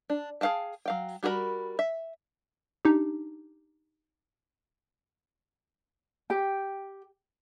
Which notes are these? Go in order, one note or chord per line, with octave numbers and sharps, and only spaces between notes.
D4
G#4 A4 F5 G5 A5
F#3 F5 G5
G3 F#4 G#4 A#4 B5
E5
D4 D#4 G4
G4 G5